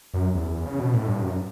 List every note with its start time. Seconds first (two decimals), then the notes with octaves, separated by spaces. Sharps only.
0.14 F#2
0.35 E2
0.66 C#3
0.79 B2
0.93 A2
1.07 G2
1.21 F#2